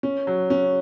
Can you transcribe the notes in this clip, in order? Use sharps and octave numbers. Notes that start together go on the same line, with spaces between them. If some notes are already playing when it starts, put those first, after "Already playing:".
C#4
F#3
C#4